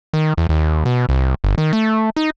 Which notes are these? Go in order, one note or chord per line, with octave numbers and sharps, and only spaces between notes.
D#3
E2
D#2
B2
C2
G1
D#3
A3
D#4